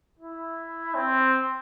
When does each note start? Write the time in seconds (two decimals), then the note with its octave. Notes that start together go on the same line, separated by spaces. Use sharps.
0.19 E4
0.95 C4